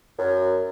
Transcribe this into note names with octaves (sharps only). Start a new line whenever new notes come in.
F#2